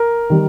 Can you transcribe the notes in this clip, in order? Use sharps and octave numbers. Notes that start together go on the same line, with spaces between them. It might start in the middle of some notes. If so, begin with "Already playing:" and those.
Already playing: A#4
D#3 G3